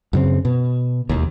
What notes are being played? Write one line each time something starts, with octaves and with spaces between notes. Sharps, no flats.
F#2 C#3 C4
B2
E1 D#2